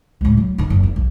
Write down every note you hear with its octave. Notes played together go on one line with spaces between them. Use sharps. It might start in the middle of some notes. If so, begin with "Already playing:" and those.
C#2 A2
F#3
D3 D#4
F#1
E2
B1